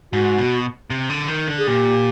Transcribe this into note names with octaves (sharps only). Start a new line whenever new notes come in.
G#2 F#4
B2
C3
D3
D#3
D3
G#4
A#2 G4